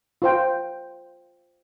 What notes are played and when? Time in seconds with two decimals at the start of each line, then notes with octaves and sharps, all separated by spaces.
0.22 F4 C5 G5